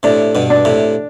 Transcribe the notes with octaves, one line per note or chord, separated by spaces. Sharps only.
A2 C3 D4
G2 B2
D4
A2 C3